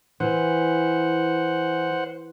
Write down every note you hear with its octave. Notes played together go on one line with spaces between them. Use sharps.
E3 C5 F#5